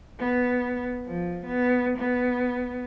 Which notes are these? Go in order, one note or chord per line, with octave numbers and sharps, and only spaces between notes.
B3
F3
B3
B3